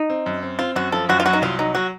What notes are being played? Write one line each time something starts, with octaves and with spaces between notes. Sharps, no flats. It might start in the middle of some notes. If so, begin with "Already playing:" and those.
Already playing: D#4
C4
F#2
C4
C4 F4
F#2 F#4
F3 A4
F#2 F#4
F4
F#3 F#4
D#4
C2 F4
F#3 D#4
F#3 F#4